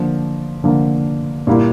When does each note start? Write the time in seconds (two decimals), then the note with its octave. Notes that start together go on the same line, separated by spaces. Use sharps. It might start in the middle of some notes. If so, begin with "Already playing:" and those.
Already playing: D3 F3 A#3
0.64 D3 F3 A#3
1.47 A#2 G3 A#3 E4